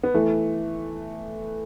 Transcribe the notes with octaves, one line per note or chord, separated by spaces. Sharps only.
B3
E3 A3